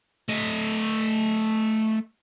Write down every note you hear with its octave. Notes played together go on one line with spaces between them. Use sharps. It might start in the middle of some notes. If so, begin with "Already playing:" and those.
A3 D#5